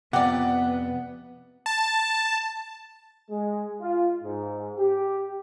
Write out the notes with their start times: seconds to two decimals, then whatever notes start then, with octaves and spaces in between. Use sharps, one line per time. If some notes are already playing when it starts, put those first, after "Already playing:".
0.13 F2 C3 B3 G4 D5 F#5
1.66 A5
3.30 G#3
3.81 F4
4.22 G#2
4.78 G4